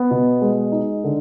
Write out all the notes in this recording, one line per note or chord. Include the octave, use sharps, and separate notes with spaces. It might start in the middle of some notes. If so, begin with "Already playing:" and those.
Already playing: B3
B2
G#3
D#4
D3